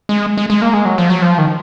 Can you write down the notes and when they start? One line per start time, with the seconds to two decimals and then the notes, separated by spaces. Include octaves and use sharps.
0.09 G#3
0.37 G#3
0.50 G#3
0.62 A#3
0.73 G#3
0.85 F#3
0.98 F3
1.10 F#3
1.22 F3
1.38 D#3